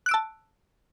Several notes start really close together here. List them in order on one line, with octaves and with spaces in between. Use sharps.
F#6 D7 E6 A5